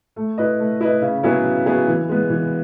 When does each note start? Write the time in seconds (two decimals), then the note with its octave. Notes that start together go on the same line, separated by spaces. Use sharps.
0.16 A3
0.38 E4 B4 D#5
0.59 A3
0.81 E4 B4 D#5
1.02 C#3
1.23 F#3 B3 E4 G#4
1.44 C#3
1.66 F#3 B3 E4 G#4
1.88 E3
2.09 G#3 B3
2.30 E3